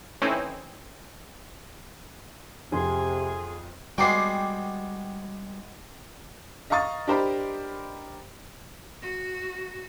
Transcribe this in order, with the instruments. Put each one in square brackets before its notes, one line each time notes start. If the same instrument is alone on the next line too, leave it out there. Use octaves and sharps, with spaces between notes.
[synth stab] E3 A3 C4 C#4 D#4 E4
[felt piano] F2 [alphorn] C3 [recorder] G#4 [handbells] G#5 C6
[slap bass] G3 [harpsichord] G#3 B3 F#4 [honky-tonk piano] G5 D6 C7
[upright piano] D#5 F5 A#5 C#6 D#6 A6
D4 G4 A#4 C5 D#5 B5
[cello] F#4